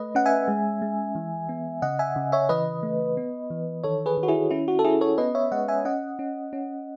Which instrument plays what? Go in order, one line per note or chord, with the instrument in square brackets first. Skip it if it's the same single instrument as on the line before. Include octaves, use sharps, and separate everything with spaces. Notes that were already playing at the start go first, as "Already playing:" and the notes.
Already playing: [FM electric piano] A3 B4 D#5
C#4 F#5
E5 G#5
G#3
G#3
E3
B3
C#3 D#5 F#5
E5 G#5
C#3
C#5 E5
E3 B4 D#5
A3
B3
E3
D#3 A4 C#5
G#4 B4
D#3
F#4
E4 G#4
C#4 E4
F#4
A4
C#4 E4 G#4
A4 C#5
B3 B4 D#5
C#5 E5
G#3 D#5 F#5
E5 G#5
C#4 D#5 F#5
C#4
C#4